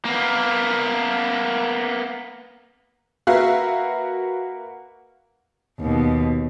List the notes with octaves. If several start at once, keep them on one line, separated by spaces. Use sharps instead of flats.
A#3 B3
A#3 F#4 A#4 B4 E5 F5
D#2 B2